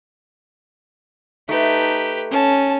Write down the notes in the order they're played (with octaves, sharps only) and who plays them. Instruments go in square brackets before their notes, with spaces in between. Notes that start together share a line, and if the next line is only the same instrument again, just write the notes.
[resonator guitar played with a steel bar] A3 [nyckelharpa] D#4 [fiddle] G4 B4
[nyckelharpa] C#4 [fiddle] A5